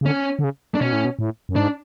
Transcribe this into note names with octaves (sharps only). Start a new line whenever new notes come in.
C#3
D3 C#4
D3
C#3
D4
B2 C#4
A2
B2
A2
F#2
G#2 D4